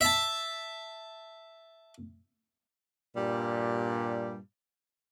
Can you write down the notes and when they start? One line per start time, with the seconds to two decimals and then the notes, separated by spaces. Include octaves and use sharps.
0.01 E5 A5
3.17 G2 A#2 G3